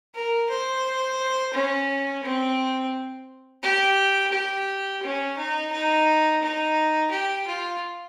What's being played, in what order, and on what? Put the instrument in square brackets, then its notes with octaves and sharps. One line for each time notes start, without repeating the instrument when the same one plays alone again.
[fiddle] A#4
C5
C#4
C4
G4
G4
C#4
D#4
D#4
D#4
G4
F4